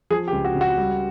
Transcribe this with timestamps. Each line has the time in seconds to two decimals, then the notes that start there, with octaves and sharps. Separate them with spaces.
0.10 F3 G#4
0.28 G4
0.32 C#2
0.45 F#4
0.55 C#3
0.61 F#4
0.78 G3